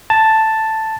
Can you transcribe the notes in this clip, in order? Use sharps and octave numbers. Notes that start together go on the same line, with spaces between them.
A5